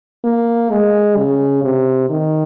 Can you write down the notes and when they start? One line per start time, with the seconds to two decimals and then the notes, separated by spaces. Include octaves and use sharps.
0.24 A#3
0.71 G#3
1.16 C#3
1.63 C3
2.09 D#3